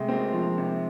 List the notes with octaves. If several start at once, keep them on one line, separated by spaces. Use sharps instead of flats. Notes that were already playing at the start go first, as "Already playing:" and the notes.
Already playing: C3 G#3 A3
A#3 C4
F3
C3